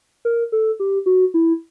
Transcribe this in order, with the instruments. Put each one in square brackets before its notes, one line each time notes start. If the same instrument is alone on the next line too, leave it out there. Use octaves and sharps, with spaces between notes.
[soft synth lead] A#4
A4
G4
F#4
E4